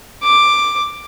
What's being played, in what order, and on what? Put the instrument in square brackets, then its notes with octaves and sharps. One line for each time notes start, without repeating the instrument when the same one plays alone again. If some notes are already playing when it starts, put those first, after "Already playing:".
[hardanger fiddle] D6